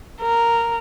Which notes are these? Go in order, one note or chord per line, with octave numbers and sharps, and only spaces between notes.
A#4